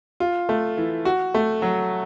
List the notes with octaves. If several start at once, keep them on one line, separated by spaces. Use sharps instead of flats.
F4
A3
E3
F#4
A3
F#3